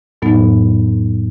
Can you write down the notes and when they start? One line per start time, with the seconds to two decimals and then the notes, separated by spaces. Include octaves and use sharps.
0.22 F2 A2 F#3 B3 D#4